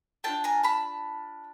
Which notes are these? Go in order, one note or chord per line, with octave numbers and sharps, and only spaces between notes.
D4 F4 A4 G5 A5
G#5 A#5
A5 B5